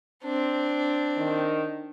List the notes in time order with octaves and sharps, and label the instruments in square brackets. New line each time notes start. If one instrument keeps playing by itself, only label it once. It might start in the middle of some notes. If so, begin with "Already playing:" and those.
[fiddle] C4 D4
[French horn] D#3